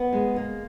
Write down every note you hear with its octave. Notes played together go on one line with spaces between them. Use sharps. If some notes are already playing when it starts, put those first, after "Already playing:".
Already playing: B3
G#3
A#3